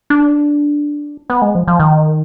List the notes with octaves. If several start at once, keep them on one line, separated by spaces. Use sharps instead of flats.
D4
B3
G#3
F3
F3
D#3